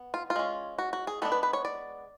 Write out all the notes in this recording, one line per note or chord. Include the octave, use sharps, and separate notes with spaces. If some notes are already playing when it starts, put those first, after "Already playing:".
Already playing: B3
F4
F4
G#3 C#4
F#4
F#4
G#4
G#3 B3 D4 A4
B4
B4
C#5
D5